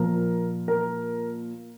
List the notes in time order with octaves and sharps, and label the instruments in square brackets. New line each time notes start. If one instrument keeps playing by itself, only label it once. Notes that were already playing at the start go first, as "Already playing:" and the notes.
Already playing: [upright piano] A#2 F3 A#4
A#4